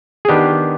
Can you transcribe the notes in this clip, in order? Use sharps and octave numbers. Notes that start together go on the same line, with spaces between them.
G#4
D#3 B3 D4 G4